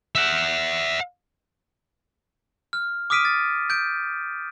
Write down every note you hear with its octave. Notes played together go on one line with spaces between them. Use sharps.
E5 F#5
F6
D6 D#6 F6 B6 D7 D#7
A6
G6 D7